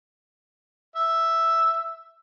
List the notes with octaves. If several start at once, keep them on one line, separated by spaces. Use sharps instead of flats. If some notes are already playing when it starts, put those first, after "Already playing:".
E5